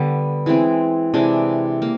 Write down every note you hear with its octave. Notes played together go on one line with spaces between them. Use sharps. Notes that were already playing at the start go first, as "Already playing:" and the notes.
Already playing: D3 G3 B3
E3 G#3 C4
C3 E3 G#3 D4
A#3